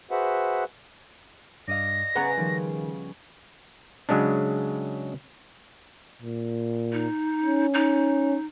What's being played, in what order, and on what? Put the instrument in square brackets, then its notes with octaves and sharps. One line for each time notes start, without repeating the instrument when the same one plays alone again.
[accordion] F#4 G#4 B4 C5 E5 F#5
[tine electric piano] G2 [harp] D5 D#5 F5 [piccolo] A#6
[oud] C#3 B3 [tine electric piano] B4 F#5 A#5
[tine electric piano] D#3 [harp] F3 G3
[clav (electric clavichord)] C#3 F#3 G#3 C#4 D4
[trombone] A#2
[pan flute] D#4
[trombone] C#4
[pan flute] D#4